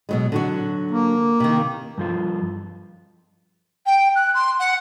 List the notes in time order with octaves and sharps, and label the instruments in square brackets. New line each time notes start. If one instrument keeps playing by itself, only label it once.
[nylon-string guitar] B2 F#3 G#3
D3 F#3 F#4
[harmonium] A#3
[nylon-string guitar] C3 D#3
[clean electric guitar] G2 F3 F4
[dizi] G5
F#6
C6
F#5